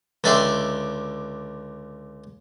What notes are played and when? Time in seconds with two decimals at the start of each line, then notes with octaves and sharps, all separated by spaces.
0.24 C#2 D3 D5 E5 G5 C6